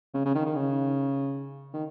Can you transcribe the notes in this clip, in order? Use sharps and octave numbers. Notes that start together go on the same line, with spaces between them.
C#3
C#3
D#3
D#3
C#3
D#3